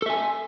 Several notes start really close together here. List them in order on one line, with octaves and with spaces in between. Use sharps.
A4 E5 G#5